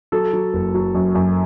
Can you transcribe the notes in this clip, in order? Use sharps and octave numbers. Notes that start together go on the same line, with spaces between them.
F#3 A4
F#3
F#1
F#3
F#2
F#2